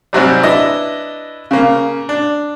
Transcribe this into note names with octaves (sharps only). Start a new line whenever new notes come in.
G#2 C3 F#3 G3
D4 E4 B4 D#5
C#3 A#3
D4